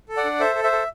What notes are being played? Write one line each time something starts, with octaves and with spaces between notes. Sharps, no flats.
A4
D5 F#5
D4
A4 C5 E5
A4
C5 E5
A4